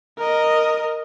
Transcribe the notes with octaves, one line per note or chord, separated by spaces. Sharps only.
A#4 D#5